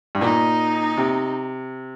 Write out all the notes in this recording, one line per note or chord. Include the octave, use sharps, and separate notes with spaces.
G2
A#2 D#4
C3